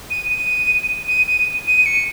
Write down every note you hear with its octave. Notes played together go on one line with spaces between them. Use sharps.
D#7
D#7
D#7
D#7
D#7
C#7